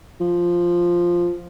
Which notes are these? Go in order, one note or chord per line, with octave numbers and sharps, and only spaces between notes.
F3